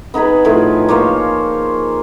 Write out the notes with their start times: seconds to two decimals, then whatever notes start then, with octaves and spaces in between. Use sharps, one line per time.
0.14 B3 D#4 G#4 B4
0.45 A2 F3 G#4 B4
0.89 A#3 C5 C#5 F5